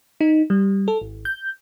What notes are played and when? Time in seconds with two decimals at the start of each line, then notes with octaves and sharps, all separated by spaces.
0.21 D#4
0.50 G3
0.88 A4
1.01 G#1
1.25 G6